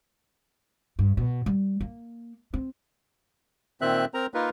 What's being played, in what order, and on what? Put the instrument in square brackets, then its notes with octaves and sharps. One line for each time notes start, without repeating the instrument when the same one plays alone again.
[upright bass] G2
B2
G3
A#3
C4
[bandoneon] A#2 D#3 C4 E5 F#6
C4 A#4 A#5
A#3 D#4 F4 A#4 B4